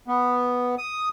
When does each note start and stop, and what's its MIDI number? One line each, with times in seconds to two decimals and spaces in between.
0.08 0.75 59
0.78 1.09 87